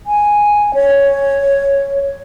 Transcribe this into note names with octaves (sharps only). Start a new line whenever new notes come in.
G#5
C#5